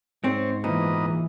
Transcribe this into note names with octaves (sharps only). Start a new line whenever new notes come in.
G#2 C4 C5 C#5
A#2 E3 A#3 B3 D#5